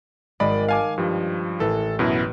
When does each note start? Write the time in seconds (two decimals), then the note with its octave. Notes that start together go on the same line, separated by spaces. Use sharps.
0.40 G#1 G#3 D5 D#5 B5
0.69 F5 G#5 A5 D6
0.98 G2 F3 G3
1.60 A1 A4 B4
1.99 F#2 B2 E4